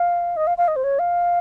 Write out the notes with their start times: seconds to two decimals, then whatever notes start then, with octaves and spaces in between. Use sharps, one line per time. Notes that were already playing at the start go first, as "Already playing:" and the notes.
Already playing: F5
0.37 D#5
0.47 F5
0.58 F5
0.68 D#5
0.76 C5
0.84 C#5
0.99 F5